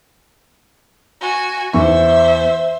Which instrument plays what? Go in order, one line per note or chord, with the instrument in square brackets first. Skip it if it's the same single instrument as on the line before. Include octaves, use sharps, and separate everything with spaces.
[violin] F#4 G#5
[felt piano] E2 C#6 [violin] C5 E5